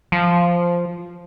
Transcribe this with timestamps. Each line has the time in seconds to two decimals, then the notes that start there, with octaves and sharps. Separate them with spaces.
0.12 F3